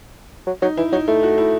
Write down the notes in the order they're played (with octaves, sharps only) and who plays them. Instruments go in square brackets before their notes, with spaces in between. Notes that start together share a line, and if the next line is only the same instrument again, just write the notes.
[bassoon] F#3
[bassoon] F#3 [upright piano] D#4
[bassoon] E3 [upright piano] E4
[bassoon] F#3 [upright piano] D#4
[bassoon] A3 [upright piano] E4
[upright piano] F#4
E4